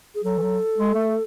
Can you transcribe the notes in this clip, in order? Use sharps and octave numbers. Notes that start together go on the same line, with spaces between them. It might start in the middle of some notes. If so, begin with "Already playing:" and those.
G#4
F#3 A4
E3
F#3
G#3
A3